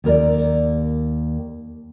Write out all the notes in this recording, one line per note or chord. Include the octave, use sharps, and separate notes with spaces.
D#2 A#4 D5